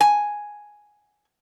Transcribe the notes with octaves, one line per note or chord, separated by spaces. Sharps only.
G#5